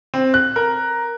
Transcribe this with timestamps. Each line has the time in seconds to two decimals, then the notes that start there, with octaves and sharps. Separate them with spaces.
0.14 C4
0.34 F#6
0.56 A#4